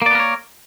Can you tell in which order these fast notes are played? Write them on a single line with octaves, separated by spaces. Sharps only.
A#3 D5 B3 A#4 C#5